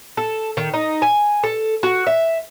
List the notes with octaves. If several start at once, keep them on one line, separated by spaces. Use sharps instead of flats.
A4
D#3
D#4
G#5
A4
F#4
E5